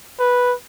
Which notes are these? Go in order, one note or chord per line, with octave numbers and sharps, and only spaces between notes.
B4